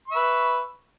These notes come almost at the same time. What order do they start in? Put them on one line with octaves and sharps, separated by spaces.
C#6 E5 B4